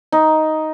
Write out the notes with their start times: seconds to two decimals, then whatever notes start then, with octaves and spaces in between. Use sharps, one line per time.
0.12 D#4